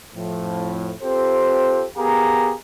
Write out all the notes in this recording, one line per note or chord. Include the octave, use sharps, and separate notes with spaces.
F2 A2 F3
C4 F4 G4 A4 C5
B3 G4 G#4 A#4 F5 A#5